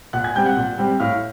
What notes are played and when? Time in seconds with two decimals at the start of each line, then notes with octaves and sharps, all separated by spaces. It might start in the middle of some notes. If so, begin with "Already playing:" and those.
0.13 A#2 F#5 F#6
0.24 G#5 G#6
0.35 G3 C4 G5 G6
0.46 F#5 F#6
0.57 A#2
0.78 G3 C4
1.00 A2 F5 F6